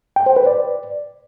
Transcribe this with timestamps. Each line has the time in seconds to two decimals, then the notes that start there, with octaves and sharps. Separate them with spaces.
0.16 G5
0.26 C5
0.36 B4
0.47 D5